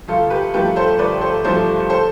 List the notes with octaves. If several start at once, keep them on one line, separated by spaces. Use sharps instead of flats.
G1 F4 A4
G4 B4
G2 F3 A3 G4 B4
A4 C5
G1 B4 D5
A4 C5
G2 F3 A3 A4 C5
A4 C5